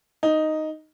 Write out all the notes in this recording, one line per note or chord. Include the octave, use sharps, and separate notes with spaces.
D#4